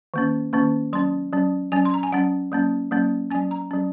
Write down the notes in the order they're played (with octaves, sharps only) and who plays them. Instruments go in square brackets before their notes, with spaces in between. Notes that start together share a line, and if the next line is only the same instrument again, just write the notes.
[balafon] D#3 A#3 C#4
D#3 A#3 C#4
F#3 C#4 C6
F#3 C#4
F#3 C#4 G#5
C6
A#5
G#5
F#3 C#4 F#5
F#3 A#3 C#4
F#3 A#3 C#4
F#3 C#4 G#5
A#5
F#3 C#4